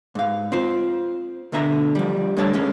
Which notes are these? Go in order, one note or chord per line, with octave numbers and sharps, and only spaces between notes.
G#2 F5
C4 F4 C5
D2 B2 D3 E5 A#5
F3 G3
A2 D3 G3 C#5 A5
F2 G#3 C#4